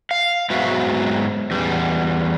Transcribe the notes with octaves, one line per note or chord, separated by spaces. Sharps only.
F5
G#2 F#3 B3 F#4 E5
E2 G3